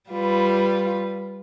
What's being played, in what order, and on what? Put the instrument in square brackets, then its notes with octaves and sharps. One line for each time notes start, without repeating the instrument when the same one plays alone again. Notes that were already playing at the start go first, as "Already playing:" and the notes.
[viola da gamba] G3 F4 B4